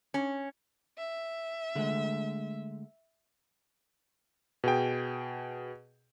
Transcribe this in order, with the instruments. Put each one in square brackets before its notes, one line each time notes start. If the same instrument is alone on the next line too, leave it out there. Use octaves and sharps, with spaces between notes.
[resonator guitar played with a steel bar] C#4
[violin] E5
[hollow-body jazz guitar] D3 G#3 A3
[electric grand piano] B2 G#4 G5